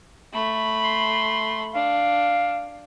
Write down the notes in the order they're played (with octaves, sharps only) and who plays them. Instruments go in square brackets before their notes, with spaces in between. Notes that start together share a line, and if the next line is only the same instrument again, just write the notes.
[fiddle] A3 B5
[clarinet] C6
[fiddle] D4 [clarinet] F5